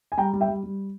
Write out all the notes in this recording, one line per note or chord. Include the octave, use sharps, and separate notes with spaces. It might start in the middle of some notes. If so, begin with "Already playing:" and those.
G#5
G3 G5 A#5
G3
E5 G5
G3
G3